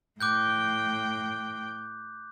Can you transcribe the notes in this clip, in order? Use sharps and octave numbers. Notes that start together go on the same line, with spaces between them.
A2 G5 D6 F#6 G6